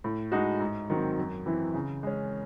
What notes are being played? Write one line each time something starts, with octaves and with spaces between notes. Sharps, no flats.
A2
G#3 D#4 F#4
G#2
D#3 F#3 C4
F#2
E3 C4 E4
C#3
G#3 C#4